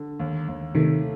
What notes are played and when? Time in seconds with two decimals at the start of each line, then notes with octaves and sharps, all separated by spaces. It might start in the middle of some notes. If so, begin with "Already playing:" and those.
Already playing: D3
0.20 D#2
0.48 D#2
0.75 C3 D#3 A3